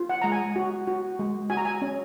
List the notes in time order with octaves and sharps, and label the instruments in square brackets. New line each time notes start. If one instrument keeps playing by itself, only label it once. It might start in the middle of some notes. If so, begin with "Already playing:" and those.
Already playing: [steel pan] F4
F#5
G#3 A#5
G#5
F#4
F#4
G#3
F#4 G#5
A#5
G#5
C#4